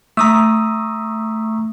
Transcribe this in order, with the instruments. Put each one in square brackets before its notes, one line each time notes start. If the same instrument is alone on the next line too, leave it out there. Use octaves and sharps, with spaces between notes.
[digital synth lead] A3 [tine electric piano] A#5 D#6 E6